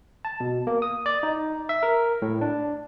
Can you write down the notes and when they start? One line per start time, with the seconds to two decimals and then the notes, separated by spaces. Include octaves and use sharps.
0.25 A5
0.40 B2
0.67 A#3
0.82 D#6
1.06 D5
1.23 D#4
1.69 E5
1.83 A#4
2.22 A2
2.41 D4